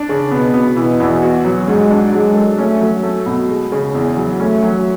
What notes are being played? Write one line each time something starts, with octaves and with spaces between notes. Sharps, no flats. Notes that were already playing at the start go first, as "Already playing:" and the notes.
Already playing: D4
C#3
B2 B3
B3
B2 E3
E2
F#4
F#3
G#2 G#3
D4
F#3 G#3
A4
A3 C#4
F#3
A3
B2
G#3
C#3
E2
F#3
A3 C#4
F#3